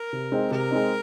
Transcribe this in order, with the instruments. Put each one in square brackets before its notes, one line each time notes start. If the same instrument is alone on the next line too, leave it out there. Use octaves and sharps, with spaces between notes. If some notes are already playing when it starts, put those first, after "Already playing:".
Already playing: [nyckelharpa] A#4
[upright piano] C3
G#3 C4 D#4
[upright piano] C3 [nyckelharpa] A#4
[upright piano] G#3 C4 D#4